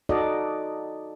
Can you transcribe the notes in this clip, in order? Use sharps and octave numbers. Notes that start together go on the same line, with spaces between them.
D#4 F#4 A4 D5 D#5